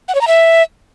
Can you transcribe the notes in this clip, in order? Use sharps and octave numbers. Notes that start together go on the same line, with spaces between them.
F#5
C#5
A#5
E5